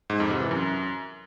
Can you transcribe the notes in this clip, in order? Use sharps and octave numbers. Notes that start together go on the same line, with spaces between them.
G#2
F2
C3
E3
F#2